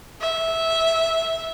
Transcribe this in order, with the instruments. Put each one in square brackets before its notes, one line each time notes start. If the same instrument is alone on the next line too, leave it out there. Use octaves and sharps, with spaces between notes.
[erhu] E5